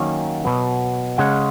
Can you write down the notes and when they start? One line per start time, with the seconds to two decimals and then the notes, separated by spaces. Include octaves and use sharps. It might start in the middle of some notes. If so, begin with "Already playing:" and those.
Already playing: D#3 F#3 A#3 C#4
0.45 B2 F#3 B3
1.18 C#3 G#3 C#4 F#5